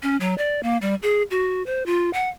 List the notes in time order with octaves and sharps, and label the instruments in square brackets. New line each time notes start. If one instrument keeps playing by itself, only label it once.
[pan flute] C#4
F#3
D5
A#3
G3
G#4
F#4
C5
F4
F#5